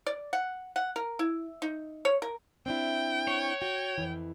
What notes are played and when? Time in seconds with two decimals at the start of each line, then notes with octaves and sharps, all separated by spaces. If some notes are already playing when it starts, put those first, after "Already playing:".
0.06 D5
0.33 F#5
0.76 F#5
0.96 A#4
1.19 E4
1.62 D#4
2.05 C#5
2.22 A#4
2.66 C4 D4 E4 G5
3.28 C#5
3.62 F#4 G5
3.98 F2 E3